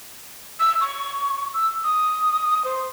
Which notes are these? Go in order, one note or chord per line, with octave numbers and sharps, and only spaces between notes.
E6
C#6
E6
D#6
C5